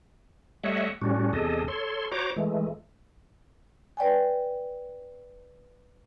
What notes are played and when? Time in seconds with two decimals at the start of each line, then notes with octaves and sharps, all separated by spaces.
0.64 G3 A3 C#5 D#5 E5 F#5
1.02 A2 G3 C#4 D4 F#4
1.33 E2 C3 D4 G#4 A4 D#5
1.68 A4 C#5 C6
2.12 F#4 C5 C#5 A#5 D6
2.36 E3 G#3 A3
3.97 B4 D5 G5 G#5